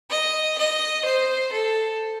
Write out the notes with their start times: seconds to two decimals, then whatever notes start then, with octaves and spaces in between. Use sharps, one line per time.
0.10 D#5
0.58 D#5
1.05 C5
1.52 A4